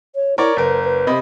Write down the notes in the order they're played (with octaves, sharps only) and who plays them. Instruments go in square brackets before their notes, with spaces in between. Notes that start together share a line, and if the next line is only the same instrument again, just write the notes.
[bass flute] C#5
[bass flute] E4 [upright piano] A#4 C#5 D5
[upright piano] F#1 A#4 [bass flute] B4
[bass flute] B4
[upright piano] C3 D#5 B5